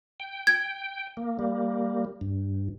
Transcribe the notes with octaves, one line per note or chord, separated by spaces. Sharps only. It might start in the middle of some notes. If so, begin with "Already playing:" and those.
G5
G#6
A#3
G3 A#3
G2